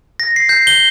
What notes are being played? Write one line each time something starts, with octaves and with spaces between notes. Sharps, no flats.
A#6
C7
G6
G7